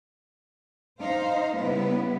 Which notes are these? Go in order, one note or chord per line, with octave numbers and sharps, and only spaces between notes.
D#4 C5 F5
C#3 G3 B3 E4 B4